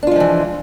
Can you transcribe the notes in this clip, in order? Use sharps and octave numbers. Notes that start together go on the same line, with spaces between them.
E3 F3 G#3 D4 F4